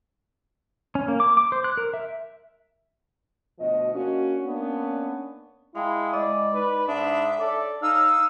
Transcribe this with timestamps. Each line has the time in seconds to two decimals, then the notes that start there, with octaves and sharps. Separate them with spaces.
0.95 C#4
1.08 A#3
1.20 D6
1.37 D6
1.52 C5
1.64 F#6
1.77 A#4
1.94 E5
3.59 D2 B2 F3 D#5
3.94 A#3 C#4 D4 F#4
4.46 A#3 B3 C#4 D4
5.75 G#3 E4 F5 G5 A5
6.13 G#3 D5 D#5
6.54 D#4 B4
6.88 G#2 D4 E5 A5 B5 D#6
7.40 A4 C#5 D5 A5
7.83 D#4 F5 E6